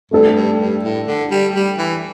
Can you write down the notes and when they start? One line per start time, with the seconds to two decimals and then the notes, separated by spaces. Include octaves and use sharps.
0.11 G2 A3 D4 A4
0.35 G2
0.59 G2
0.83 A2
1.07 D3
1.31 G3
1.55 G3
1.78 E3